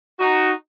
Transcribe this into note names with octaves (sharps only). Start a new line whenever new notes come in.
D#4 F#4